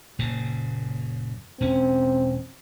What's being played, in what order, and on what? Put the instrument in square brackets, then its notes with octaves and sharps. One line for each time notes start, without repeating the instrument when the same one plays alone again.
[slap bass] F#1 A#2 C#3
[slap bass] E1 C#4 [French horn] C4